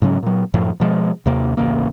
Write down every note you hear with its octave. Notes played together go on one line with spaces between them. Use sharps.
G#2 C#3 F#3 C#4
A#2 F#3
F#2 A2 F3
B2 F3 G#3
D#2 C3 A#3
D1 A1 C#3 A#3